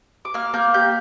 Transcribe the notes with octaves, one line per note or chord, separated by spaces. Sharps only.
D6
A#3 F6
A#3 G6
G4 G6